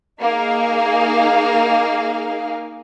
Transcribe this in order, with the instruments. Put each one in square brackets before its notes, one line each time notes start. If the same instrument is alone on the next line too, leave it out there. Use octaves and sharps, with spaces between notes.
[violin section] A#3 D#4 G#4 F5